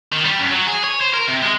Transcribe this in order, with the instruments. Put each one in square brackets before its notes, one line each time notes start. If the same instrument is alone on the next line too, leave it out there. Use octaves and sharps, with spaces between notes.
[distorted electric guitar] D#3
G3
F#2
F#3
G#4
C#5
C5
A#4
C3
G#3